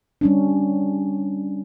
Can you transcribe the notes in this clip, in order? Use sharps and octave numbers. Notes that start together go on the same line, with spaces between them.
G3 C#4 D4